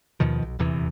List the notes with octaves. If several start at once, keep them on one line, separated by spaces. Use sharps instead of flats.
D#2 B2 D#3 F3
B1
D#1 E2 C3 E3